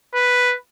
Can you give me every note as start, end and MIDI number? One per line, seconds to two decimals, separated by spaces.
0.14 0.55 71